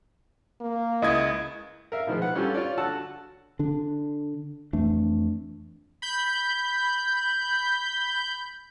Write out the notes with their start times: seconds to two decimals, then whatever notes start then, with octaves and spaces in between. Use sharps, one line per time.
0.60 A#3
1.02 C#2 E4 D#5 G#6
1.92 A#4 E5 F5
2.07 B2 D#3 F3 G#3
2.22 B4 F#5
2.35 G3 C#4 D4 F4 G4 A4
2.54 F4 C#5 D5
2.77 D3 F#4 F#5 A5 E6
3.59 D3 D4
4.73 F2 E3 A3 D4
6.02 B5 G6